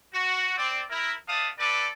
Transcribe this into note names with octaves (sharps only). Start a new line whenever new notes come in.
F#4
C4 D5
E4 A#4
A3 B3 D5 F5 A5 D#6
C4 A4 B4 D5